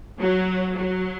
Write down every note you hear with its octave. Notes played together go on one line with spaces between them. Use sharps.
F#3
F#3